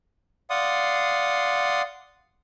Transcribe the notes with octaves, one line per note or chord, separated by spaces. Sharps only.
D5 F5 F#5 C6 D#6